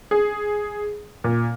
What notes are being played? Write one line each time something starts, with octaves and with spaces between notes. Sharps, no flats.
G#4
A#2